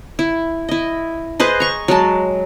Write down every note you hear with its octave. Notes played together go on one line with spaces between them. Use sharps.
E4
E4 D#5
G#4 B4 C5 D#5
A#5 C#6
F#3 G#3 A5